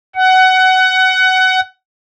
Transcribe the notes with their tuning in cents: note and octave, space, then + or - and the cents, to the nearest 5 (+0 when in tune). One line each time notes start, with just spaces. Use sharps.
F#5 +20